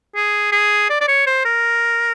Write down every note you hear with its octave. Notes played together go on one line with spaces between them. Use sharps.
G#4
G#4
D5
D5
C#5
C5
A#4